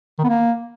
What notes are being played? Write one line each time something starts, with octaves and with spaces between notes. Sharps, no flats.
D#3
B3
A#3